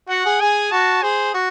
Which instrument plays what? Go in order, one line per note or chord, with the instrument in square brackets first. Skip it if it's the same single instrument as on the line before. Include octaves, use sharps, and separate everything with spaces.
[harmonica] F#4 [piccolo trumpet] F#5
[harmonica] G#4
[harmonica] G#4 [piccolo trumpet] G#5
[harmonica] F#4 [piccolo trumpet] A5
[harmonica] G#4 [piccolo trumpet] C5
[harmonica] F#4